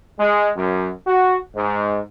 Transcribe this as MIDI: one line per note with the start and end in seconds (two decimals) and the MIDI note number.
0.19 0.50 56
0.56 0.89 42
1.07 1.37 66
1.56 1.99 44